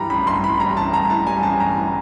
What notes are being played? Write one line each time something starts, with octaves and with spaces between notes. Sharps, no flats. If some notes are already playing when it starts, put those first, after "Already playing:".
Already playing: G2 E3 G3 A#5 B5
A1 B5
G2 C6
E3 B5
G3 A#5
A1 A5
G2 A#5
E3 A5
G3 G#5
A1 A5
G2 A#5
E3